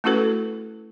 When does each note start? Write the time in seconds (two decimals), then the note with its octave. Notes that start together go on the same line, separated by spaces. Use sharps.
0.04 A3 C#4 E4 F#4 A4 B4